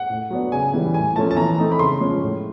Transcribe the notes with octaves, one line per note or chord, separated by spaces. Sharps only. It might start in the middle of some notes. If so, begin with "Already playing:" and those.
Already playing: F#5
A2
F#3 B3 D4
C#3 G#5
E3 G3
A2 G#5
F3 A3 C#4 A5
A5
E3 A#5
A3 C4 D#4
B5
C#3 C6
F3 G#3 C#4
A2